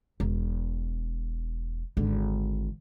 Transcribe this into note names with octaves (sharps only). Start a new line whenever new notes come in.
E1
G#1 D3